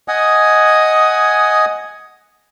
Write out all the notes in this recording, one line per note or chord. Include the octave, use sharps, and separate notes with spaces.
D#5 F#5 G#5 D#6